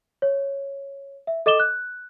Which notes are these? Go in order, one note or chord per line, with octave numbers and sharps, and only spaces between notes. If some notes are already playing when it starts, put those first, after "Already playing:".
C#5
E5
A4 D#5 D6 E7 G7
F#6